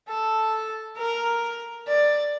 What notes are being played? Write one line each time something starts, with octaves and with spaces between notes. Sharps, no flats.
A4
A#4
D5